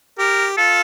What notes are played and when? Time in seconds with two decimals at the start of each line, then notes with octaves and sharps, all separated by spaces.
0.19 G4 A#4
0.58 F4 A4